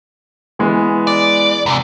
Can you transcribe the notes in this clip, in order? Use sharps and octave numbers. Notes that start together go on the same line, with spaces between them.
E3 G#3 B3
D5
E2 C3